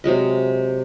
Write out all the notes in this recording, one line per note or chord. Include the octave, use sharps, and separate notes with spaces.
C3 F#3 G#3 D#5